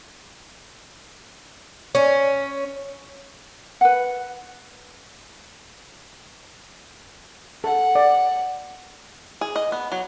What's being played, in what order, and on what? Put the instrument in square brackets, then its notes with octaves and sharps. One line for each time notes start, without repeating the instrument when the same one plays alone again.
[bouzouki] C#4
[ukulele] B4 F#5
[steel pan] A4 [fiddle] F#5
[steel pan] D5
[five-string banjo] G#4
D#5
B3
F#3